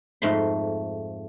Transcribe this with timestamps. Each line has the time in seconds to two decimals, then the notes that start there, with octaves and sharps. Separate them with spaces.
0.22 F2 G#2 A3 B5 C6